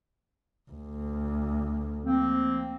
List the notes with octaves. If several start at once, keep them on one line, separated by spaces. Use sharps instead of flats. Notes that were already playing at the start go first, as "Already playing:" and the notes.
D2
F3 A#3 C4